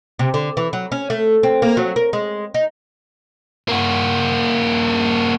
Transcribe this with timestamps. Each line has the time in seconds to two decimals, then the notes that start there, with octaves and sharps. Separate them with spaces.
0.19 C3
0.34 D3
0.57 E3
0.73 F#3
0.92 C#4
1.10 A3
1.43 C4
1.62 A#3
1.77 F#3
1.96 A#4
2.13 G#3
2.54 D#4
3.68 A#3 F#4